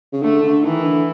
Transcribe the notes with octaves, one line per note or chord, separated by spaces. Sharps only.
C#3
D3 A3
D3
D#3 E3
D3